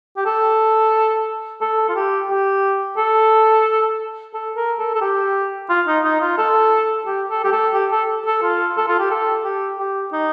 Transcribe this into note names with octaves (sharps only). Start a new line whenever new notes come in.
G4
A4
A4
F4
G4
G4
A4
A4
A#4
A4
A4
G4
F4
D#4
D#4
F4
A4
G4
A4
G4
A4
G4
A4
A4
F4
A4
F4
G4
A4
G4
G4
D#4